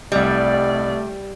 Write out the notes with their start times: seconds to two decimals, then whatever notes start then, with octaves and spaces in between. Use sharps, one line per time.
0.12 C2 G3 A3 D5 D#5